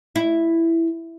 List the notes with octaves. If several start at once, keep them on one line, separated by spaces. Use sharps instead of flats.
E4